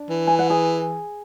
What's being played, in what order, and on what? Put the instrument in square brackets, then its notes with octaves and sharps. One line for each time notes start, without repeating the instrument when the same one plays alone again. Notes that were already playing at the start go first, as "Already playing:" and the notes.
Already playing: [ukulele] D4
[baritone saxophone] E3
[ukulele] G#5
F#5
G#4 G#5